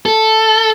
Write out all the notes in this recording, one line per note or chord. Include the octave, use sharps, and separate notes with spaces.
A4